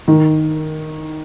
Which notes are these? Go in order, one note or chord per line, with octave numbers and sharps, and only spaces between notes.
D#3